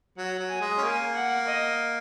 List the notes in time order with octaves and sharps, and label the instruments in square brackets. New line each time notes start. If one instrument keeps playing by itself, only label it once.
[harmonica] F#3 [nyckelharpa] F#5
[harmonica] F#3
[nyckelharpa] G#5
[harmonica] G#3
C#4
[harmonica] A#3 [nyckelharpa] G#5
[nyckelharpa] F#5
D#5